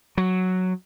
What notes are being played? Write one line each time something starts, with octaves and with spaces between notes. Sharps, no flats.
F#3